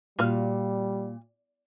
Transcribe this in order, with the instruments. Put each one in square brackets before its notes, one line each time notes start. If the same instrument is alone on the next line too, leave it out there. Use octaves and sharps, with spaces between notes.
[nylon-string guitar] A#2 [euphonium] G3 [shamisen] F4 F#4 F5